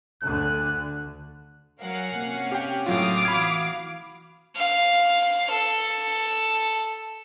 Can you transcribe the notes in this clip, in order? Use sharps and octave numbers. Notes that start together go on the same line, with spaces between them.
D2 D3 F#6
F#3 A#4 F5 F#5 G#5
C3 A#3 C#4
G4 G5
A2 F#3 F4 F5 D6 D#6
E3 F#4 B5 G#6
F5
A4